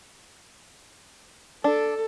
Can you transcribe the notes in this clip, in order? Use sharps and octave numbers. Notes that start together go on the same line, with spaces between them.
D4 A4